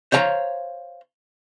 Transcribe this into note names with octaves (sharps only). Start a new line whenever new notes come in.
C5 C#5 F5 A5 A#5